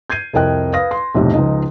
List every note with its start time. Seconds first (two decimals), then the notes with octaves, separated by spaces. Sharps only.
0.10 G6 G#6 C7 D#7
0.33 C2 F2 A#4 D#5 G5 F#6
0.73 B4 F5 D#6 A#6
0.91 C6
1.15 B1 F2 A2 C3
1.34 C#2 F3 D#4 D#5